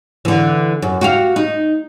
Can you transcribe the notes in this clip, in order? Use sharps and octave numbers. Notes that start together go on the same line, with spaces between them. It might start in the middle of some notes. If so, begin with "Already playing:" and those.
D3 E3
F#2
F#4 G4 F5
D#4